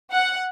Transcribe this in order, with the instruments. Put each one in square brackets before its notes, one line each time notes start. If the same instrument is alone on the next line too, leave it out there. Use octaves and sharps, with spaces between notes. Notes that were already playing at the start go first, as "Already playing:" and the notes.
[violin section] F#5